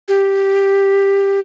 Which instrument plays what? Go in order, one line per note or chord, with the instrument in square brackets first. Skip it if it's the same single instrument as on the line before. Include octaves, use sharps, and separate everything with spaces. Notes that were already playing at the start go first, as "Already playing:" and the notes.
[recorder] G4